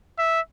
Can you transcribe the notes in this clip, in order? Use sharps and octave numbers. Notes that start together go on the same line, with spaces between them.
E5